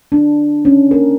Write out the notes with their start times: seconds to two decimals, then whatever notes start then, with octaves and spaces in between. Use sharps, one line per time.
0.12 D4
0.65 C#4
0.91 A#4